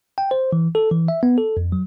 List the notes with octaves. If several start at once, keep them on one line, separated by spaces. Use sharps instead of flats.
G5
C5
E3
A4
E3
E5
B3
A4
F2
F#3